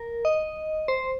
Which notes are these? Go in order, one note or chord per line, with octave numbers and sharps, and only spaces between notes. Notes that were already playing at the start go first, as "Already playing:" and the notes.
Already playing: A#4
D#5
C5